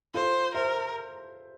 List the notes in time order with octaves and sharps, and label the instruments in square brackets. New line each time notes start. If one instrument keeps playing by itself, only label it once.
[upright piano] F4 A4 [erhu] C5
[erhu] A#4 [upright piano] C5 E5